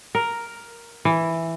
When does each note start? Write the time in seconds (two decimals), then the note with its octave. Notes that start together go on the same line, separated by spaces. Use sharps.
0.15 A#4
1.05 E3